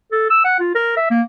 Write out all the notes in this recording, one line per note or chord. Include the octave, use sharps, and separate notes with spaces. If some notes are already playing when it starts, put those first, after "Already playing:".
A4
E6
F#5
F4
A#4
E5
A#3